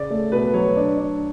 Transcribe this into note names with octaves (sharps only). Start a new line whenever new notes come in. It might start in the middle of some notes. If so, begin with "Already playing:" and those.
Already playing: C#3 D5
A3
B2 B4
F#3 C#5
D4
D4